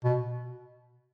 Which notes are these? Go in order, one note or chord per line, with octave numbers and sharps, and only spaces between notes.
B2